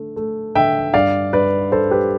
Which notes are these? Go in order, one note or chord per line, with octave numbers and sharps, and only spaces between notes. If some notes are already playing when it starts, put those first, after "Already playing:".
Already playing: D3 A3
A3
D3 E5 G5
G2 D5 F5
G2 B4 D5
G2 A4 C5
G4 B4